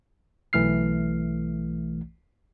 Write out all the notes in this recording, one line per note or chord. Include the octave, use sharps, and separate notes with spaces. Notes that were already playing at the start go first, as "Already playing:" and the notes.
B1 E3 A3 F6 C7